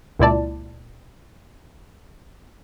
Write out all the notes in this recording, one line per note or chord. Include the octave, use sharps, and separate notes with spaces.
C#2 A#2 E4 D5 A5